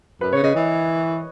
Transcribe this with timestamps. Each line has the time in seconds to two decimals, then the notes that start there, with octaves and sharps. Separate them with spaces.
0.21 F#2 B4
0.33 C#3 C#5
0.43 C#3 D#5
0.55 E3